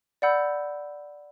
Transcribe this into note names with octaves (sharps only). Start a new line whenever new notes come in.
D5 F#5 B5 E6 G6